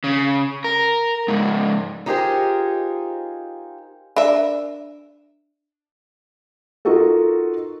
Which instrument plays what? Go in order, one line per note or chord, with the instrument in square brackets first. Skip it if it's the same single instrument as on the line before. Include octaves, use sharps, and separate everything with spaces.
[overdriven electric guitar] C#3
A#4
C#2 G#2
[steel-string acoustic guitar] D#4 F4 G4 G#4 A#4 C5
[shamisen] D4 A#4 E5
[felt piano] D#4 F4 F#4 A4 A#4